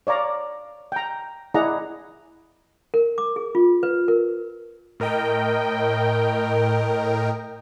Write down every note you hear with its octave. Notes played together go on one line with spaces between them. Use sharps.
C#5 D5 F5 A#5
G5 A#5
E4 G#4 D5 D#5 F#5 A#5
A#4
D6
G#4
F4
B4
A#4
A2 A#4 D#5 G5